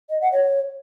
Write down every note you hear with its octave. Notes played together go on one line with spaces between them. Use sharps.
D#5
F#5
C#5